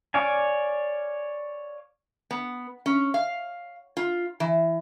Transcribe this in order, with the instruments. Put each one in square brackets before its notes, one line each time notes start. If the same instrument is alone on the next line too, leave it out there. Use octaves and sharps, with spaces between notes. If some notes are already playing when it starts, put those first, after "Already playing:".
[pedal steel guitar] C#5 D5 F5 G#5
[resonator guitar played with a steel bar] B3
C#4
F5
F4
E3